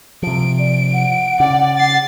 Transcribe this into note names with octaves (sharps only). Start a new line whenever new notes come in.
C3 F3 D7
D5
F#5
C#3 D5
A6 C7